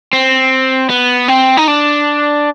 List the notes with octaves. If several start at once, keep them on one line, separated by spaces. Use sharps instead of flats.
C4
B3
C4
D#4
D4